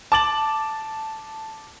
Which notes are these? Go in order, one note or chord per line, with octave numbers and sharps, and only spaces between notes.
A5 D6 A6 F#7